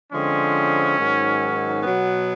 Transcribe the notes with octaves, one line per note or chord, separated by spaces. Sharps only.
D3 F3 G#3 C4 C#4
G#2 D#3 F#3
B2 F#3 B3